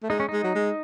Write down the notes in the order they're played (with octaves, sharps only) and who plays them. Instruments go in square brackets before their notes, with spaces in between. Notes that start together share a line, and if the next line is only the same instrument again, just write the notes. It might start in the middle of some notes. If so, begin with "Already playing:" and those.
[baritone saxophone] A3
[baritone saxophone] G#3 [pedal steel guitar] D#4
[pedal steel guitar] C#4
[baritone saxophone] G#3 [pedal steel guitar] D#4
[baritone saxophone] F#3
G#3